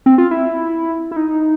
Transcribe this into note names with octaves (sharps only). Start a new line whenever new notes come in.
C4
F4
E4
E4
D#4